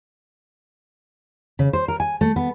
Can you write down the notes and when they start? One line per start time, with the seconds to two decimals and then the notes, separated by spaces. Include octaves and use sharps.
1.59 C#3
1.73 C5
1.88 A#4
2.00 G#5
2.21 A3
2.36 B3